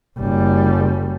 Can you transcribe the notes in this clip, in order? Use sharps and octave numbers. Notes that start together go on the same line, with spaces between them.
F#1 G3